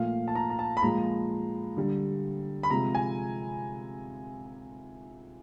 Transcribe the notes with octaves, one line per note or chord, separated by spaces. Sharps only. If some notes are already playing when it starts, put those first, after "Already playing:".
Already playing: A#2 F3 A3 F5
A5
A#5
A#5
A5
B5
A#2 F3 G#3 A#5
D3 G3
B5
C3 F3 G#3 A#5
G#5